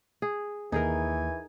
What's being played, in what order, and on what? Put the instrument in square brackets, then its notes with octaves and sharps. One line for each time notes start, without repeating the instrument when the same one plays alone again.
[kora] G#4
[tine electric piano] D#2 [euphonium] E3 [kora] D#4 G#4 A#4 [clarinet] G#5